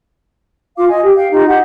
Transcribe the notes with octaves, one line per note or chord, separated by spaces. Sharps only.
F4 F5 D6
D#5 G#5
G4
F5 G5
D#4 F4 G4
G4 D#5 F#5